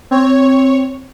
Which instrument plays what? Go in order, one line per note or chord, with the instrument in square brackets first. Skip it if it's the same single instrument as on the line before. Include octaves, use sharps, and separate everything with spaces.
[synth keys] C4 [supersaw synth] C#5